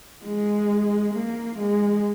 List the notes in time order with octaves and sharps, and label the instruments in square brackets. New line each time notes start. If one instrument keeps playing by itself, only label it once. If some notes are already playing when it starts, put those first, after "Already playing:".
[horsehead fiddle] G#3
A#3
G#3